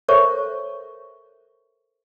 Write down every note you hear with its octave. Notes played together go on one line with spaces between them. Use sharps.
A4 A#4 C5 C#5 E5 C#6